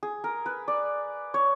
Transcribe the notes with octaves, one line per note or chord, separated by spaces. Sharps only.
G#4
A#4
B4
D5
C#5